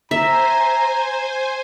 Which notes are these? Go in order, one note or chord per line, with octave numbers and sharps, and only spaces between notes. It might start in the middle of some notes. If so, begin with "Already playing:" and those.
C5 E5 G#5 A#5